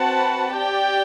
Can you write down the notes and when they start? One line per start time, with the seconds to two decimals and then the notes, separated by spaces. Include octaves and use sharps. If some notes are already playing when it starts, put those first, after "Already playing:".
Already playing: C4 F#4 B4 F#5 A5
0.53 G4 D5 G5